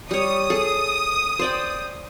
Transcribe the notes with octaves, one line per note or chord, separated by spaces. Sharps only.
G3 C#5 D#6
G#4 A4
C5 D5 G5